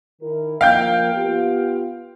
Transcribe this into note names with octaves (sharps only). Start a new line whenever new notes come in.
D#3 E4 A#4
F3 A#3 A#4 F5 G5 G6
B3 F4 G4